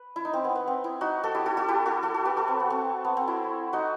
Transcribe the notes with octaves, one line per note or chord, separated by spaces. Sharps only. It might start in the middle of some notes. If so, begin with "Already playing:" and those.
Already playing: B4
E4
D#4
C4
B3
B3
C4
E4
D#4 F#4
F#4 A4
E4 G4
F#4 A4
F#4 A4
E4 G4
F#4 A4
F#4 A4
F#4 A4
G4 B4
F#4 A4
C4
B3
C4
B3
C4
E4
D#4 F#4